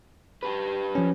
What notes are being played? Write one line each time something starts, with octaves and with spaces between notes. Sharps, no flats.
G4 B4
F3 C#4